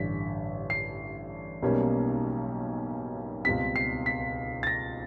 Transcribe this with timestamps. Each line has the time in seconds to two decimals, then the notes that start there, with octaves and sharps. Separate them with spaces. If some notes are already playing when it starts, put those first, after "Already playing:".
Already playing: A1 G2 D3 B6
0.70 C7
1.62 B1 B2 G3 A#3 C#4
3.45 C#2 B2 G3 C4 B6
3.76 C7
4.06 B6
4.63 A6
4.67 A#6